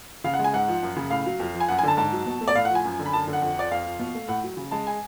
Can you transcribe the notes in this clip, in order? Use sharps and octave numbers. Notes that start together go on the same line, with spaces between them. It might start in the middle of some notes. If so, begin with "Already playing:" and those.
C#3 F5
F#5
G#3
G#5
G#2 F#5
F3
F#2
C#3
A2 F5
F#3
F2
F3
G#5
F#2 F#5
G#5
D3 A5
G#2 A5
F#3
B2
A3
D5
A2 F5
F#5
F3
G#5
F#2
D3
B5
F#2 A5
D3
F#5
F2
F3 D5
F2 F5
F3
B2
A3
A2 F#5
F#3
C#3
G#3 A5
G#5